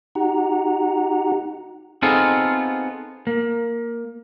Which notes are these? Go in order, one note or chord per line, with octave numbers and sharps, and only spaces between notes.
D#4 F#4 G4 F#5 A#5
B3 C4 D#4 F4 G#4 A4
A#3